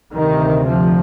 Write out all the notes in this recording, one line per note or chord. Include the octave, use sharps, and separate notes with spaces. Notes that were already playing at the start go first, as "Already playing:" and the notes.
D2 C3 D#3
F3